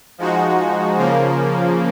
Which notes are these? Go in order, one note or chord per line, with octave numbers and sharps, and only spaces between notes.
F3 G#3 D#4 F#4
C#3 F3 A#3